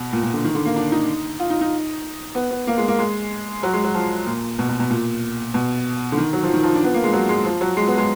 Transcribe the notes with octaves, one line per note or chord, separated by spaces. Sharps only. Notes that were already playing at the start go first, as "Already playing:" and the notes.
Already playing: B2
A#2
A#2
D3
D#3
D3
A#3
D4
D#4
F4
D#4
D#4
B3
B3
A#3
G#3
A#3
G#3
F#3
G#3
F#3
F3
A#2
B2
B2
B2
A#2
B2
D3
D#3
F#3
F3
D#3
F3
D4
B3
A#3
G#3
F#3
G#3
F3
F#3
G#3
B3
G#3